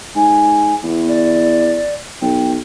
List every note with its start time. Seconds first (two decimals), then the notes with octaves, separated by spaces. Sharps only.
0.15 G#2 G#5
0.84 E2 B3
1.08 D5
2.21 B1 G5